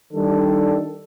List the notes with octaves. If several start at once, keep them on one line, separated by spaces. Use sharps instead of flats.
D#3 G3 D4 A4